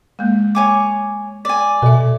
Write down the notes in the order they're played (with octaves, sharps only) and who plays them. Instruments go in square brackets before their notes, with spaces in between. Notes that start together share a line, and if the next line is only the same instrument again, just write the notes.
[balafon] G#3 A#3
[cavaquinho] C#5 G#5 D6
D5 G#5
[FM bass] B2 [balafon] A4 E5